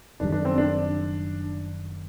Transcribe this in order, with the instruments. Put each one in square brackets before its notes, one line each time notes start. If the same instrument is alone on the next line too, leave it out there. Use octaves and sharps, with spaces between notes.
[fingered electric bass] F#1 F#2 D#3 G3 [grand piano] D4
[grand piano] D4
C4
D4